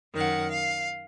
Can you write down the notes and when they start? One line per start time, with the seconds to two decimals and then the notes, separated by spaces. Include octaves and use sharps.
0.14 F#2 D#3 F#5
0.50 F5